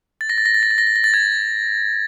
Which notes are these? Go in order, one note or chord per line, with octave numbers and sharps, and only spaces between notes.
A6
A#6
A6
A#6
A6
A#6
A6
A#6
A6
A#6
A6
G#6